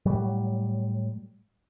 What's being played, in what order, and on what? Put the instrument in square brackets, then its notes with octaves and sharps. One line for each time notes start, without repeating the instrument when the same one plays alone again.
[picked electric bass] A2 F#3 G3